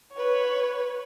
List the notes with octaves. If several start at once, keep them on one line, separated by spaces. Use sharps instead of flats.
B4 C#5